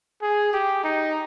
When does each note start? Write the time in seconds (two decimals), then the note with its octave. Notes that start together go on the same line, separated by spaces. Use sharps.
0.22 G#4
0.53 G4
0.84 D#4